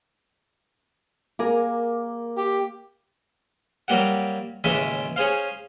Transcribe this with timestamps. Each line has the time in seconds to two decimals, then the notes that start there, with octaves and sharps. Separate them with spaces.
1.39 A#3 G#4 A#4
2.37 G4
3.88 F#3 G3 A#3 G4 F#5
4.64 A1 D#2 C#3 G#3 E5 B5
5.16 C#4 G#4 C5 F5